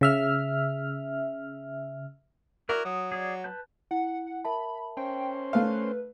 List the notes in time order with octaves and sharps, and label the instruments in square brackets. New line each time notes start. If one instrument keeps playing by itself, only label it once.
[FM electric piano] C#3 E5 F6
[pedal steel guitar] E4 F#4 D5 [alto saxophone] A#4
[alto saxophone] F#3 [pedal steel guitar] D#6
[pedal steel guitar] G#4 D5
B4 A5 G6
[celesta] E4 [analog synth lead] F#5
[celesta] A#4 E5 A5 [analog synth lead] B5
[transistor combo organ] C#4 C5 [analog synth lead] G5
[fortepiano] A3 F5 [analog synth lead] B4